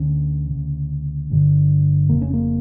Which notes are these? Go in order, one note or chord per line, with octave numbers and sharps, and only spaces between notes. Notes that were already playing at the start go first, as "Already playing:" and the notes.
Already playing: D2 D3 C#4
D2 C#3
G1 G2 D3
F1 F2 C#3 A#3
C#4
A#3